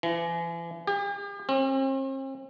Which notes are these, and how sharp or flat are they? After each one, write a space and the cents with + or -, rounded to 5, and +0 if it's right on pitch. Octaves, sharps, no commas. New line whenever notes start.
E3 +40
G4 +45
C4 +45